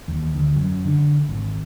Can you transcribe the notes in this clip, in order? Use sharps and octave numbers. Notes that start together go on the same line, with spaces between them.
D#2
D2
F#2
D3
G#1